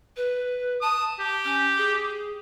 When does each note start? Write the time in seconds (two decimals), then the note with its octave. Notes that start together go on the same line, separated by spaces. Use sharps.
0.16 B4
0.82 A5 D#6
1.20 G4
1.44 C#4
1.77 G#4